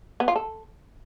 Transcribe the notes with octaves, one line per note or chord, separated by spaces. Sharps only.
B3
F4
A4